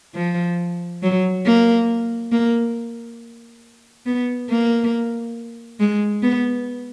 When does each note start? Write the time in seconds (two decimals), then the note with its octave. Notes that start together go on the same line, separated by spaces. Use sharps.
0.15 F3
1.02 F#3
1.46 A#3
2.32 A#3
4.06 B3
4.49 A#3
5.80 G#3
6.22 B3